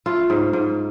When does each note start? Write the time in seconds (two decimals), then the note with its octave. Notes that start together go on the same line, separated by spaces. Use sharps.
0.06 A3 F4
0.30 G#2
0.53 G#2